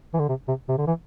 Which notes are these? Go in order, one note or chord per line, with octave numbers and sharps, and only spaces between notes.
E3
D3
C3
C3
C3
D3
E3